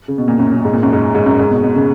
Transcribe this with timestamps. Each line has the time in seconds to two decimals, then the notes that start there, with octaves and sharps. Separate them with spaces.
0.08 C#3
0.18 B2
0.28 A#2
0.39 F#2
0.52 F#2
0.65 G#2
0.73 A#2
0.83 F#2
0.93 G#2
1.15 G#2
1.26 F#2
1.39 G#2
1.51 B2
1.64 B2
1.75 C#3